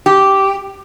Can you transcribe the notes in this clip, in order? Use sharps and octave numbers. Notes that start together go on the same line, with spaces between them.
G4